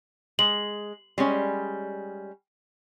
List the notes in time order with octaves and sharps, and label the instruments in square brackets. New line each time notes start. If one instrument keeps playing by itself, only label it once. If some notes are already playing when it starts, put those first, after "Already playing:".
[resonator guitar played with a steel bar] G#3 [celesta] F#7
[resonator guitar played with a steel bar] G3 G#3 C#4